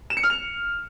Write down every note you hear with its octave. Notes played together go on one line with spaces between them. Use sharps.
E7
C#7
F6
F7